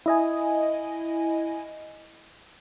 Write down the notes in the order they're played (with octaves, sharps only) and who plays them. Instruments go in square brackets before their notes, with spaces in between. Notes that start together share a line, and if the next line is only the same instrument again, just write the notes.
[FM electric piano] E4 D#5 G#5